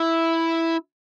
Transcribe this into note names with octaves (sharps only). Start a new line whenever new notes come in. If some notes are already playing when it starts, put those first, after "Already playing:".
Already playing: E4